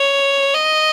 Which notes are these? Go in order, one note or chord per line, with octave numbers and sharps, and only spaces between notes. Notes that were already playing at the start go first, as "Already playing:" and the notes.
Already playing: C#5
D#5